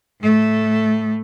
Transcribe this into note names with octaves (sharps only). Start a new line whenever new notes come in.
A2 A3